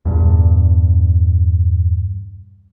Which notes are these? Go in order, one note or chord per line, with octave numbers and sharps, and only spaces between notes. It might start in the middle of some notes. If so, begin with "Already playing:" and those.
E2 G2 A#2